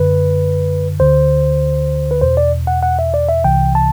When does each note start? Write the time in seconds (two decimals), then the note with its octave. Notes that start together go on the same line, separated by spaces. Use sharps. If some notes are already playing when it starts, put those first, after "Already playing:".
Already playing: F#2 D3 B4
0.99 D2 D3 C5
2.11 B4
2.21 E2 B2 C5
2.37 D5
2.67 F#5
2.83 F#5
2.99 E5
3.14 D5
3.29 E5
3.44 C2 C3 E3 G5
3.75 A5